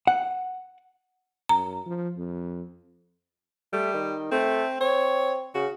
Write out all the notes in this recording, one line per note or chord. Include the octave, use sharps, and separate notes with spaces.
F#5
F#2 A#5
F3
F2
G3 A3
D#3
A3 C4
C4 C#5
C#3 F#4